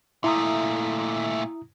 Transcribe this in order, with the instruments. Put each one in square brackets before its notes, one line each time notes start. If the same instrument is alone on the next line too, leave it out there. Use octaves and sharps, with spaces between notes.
[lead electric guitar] A#2 A3 [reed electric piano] E4 A#5 D#6